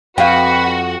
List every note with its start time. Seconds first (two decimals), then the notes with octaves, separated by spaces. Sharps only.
0.18 F2 F#4 B4 F5 G5